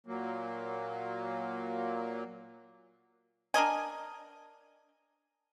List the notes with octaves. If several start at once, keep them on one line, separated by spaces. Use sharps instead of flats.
A#2 F#3 A#3
D4 A#4 D#5 G#5